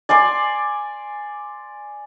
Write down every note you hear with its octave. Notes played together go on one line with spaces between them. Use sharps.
D5 G#5 C6 D6